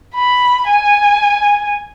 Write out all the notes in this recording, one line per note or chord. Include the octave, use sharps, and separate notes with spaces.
B5
G#5